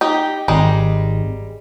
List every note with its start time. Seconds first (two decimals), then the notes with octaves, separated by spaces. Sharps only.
0.01 D#4 G4
0.48 G#1 G3 G#3 D#4